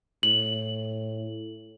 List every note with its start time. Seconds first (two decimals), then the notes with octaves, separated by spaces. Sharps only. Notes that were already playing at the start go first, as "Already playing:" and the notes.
0.23 A2 F#7